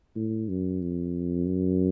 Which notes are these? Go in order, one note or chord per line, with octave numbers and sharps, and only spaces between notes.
A2
F#2
F2
F#2